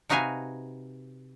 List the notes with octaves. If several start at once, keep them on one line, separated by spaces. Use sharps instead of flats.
C3 D#4 F#4 B4 F5 G#5